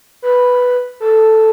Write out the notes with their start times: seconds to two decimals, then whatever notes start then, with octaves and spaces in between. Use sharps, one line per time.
0.22 B4
1.00 A4